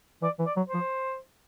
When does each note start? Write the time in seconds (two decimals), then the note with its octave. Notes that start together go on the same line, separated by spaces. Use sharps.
0.22 E3 D5
0.39 E3
0.46 D5
0.57 F#3
0.69 C5
0.74 F3